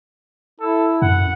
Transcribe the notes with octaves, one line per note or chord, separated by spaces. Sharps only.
E4 A4
F#2 F#5